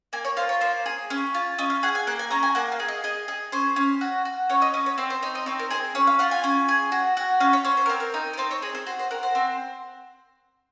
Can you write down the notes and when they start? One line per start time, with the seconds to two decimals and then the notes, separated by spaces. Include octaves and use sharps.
0.13 A#3 G#5
0.25 C#5
0.37 F4 C5
0.49 C#5
0.61 A#3 C5
0.86 G#4
1.10 C#4
1.35 F4
1.58 C#4 D#5
1.70 F5
1.83 G#4 F#5
1.95 G#5
2.07 A#3 F#5
2.19 G#5
2.31 C#4 A#5
2.43 G#5
2.55 A#3 F#5
2.72 F5
2.80 G#4
2.88 D#5
3.04 G#4 D#5
3.28 G#4 D#5
3.52 C#4 C5
3.76 C#4
4.01 F#4
4.25 F#4
4.50 C#4 C#5
4.62 D#5
4.74 C#4 D#5
4.86 C#5
4.98 C4 C5
5.10 C5
5.22 D#4 C#5
5.35 D#5
5.46 C4 C#5
5.59 A#4
5.70 G#4 C5
5.95 C#4 C#5
6.07 F5
6.19 F4 F#5
6.31 G#5
6.44 C#4
6.69 G#4
6.92 F#4
7.17 F#4
7.40 C#4 F5
7.53 C#5
7.64 C#4 C5
7.77 C5
7.86 A#4
7.90 C4
8.00 A#4
8.14 D#4
8.33 A#4
8.37 C4 C5
8.51 C#5
8.62 G#4 D#5
8.75 C5
8.87 F#4 C5
8.99 C5
9.11 F#4 A#4
9.23 C5
9.35 C4